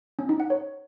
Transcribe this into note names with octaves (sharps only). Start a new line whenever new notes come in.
C#4
D#4
F#5
C#5